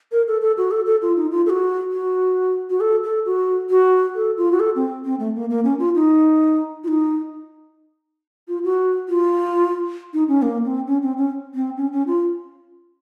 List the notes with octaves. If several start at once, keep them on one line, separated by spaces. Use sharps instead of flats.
A#4
A4
A4
F#4
A4
A4
F4
D#4
F4
A4
F#4
F#4
F#4
A4
A4
F#4
F#4
A4
F4
F#4
A4
C4
C4
A3
A#3
A#3
C#4
F4
D#4
F4
D#4
F4
F#4
F4
D#4
C#4
A#3
C4
C#4
C4
C#4
C4
C#4
C#4
F4